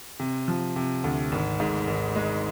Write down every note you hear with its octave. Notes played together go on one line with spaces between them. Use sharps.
C3
F3
C3
D2
G#1
G#2
G#1
G#3